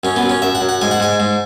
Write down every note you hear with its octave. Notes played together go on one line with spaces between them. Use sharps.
F#2 C#4
B3
F#2
C#4
F#2 E5
F#5
F#2
F#5
G#2 G#5
F#5
G#2 G#5
G#2